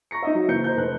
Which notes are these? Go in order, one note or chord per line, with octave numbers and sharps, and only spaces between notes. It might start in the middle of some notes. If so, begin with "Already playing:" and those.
A#5 C#6 A#6 C#7
D#4 D#5 E5
F#3
F#1 E3 A#3 C5 G6 C#7
C5 A#5 G6
F1 F#6